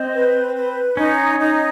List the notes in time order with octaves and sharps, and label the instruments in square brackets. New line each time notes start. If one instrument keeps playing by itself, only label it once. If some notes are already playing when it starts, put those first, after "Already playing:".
Already playing: [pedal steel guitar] C4 [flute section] D#5
[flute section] B4
B4
[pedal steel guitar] C#4 [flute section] D#4
[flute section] D#4